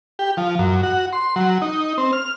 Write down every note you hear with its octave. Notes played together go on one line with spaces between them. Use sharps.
G4
F3
F#2
F#4
C6
F#3
D#4
C4
F6